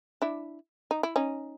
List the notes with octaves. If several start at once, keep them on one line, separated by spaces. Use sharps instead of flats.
D4 E4
D#4
E4
C#4 D#4